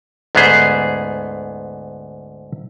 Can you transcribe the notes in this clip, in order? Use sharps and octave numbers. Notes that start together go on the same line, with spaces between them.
D2 G#2 B3 C#4 G#4 C5